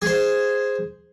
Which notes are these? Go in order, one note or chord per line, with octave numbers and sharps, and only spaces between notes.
G#4 C5